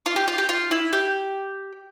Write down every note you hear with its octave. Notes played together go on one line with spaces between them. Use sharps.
F4
G4
F4
G4
F4
E4
G4